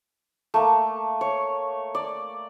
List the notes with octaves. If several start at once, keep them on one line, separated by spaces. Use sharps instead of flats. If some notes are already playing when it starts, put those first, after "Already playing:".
A3 A#3
C#5
D5